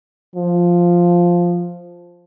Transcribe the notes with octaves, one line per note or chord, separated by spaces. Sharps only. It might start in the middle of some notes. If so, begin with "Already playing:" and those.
F3